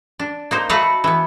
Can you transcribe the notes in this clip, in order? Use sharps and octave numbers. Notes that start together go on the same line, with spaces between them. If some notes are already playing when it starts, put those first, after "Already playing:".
D4
A#3 D#4 C5
A3 F#4 B4 F5 F#5
E3 B3